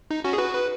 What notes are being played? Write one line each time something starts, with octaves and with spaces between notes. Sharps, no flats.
D#4
C#4 F#4
G#4
F#4 B4
B4